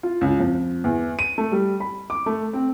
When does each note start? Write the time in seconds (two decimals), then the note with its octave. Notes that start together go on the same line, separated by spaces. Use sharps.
0.03 F4
0.21 C#2
0.40 F2
0.84 E2
1.19 D#7
1.38 A3
1.52 G3
1.80 B5
2.10 D6
2.26 A3
2.53 C4